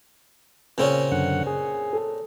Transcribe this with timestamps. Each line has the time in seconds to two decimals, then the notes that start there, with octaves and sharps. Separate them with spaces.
0.78 A#2 C#3 C4 C#4
1.12 F#2 D3 F#5
1.47 G#4
1.93 A4